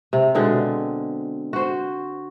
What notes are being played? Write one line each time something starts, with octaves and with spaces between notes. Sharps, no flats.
C3
B2 D3 G#3 C4
F#4 C5